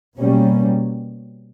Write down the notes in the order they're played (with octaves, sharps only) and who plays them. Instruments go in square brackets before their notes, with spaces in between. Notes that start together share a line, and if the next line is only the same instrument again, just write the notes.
[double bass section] B2 G3 A#3 C#4